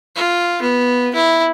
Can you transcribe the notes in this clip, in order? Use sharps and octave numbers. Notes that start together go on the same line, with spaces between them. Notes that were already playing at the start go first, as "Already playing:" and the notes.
F4
B3
E4